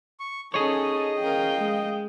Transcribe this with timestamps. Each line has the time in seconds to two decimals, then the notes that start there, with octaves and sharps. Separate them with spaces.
0.20 C#6
0.54 C#4 D#4 G#4 A4 C#5 D#5
1.20 C#4 A#4 F5 G5
1.57 G#3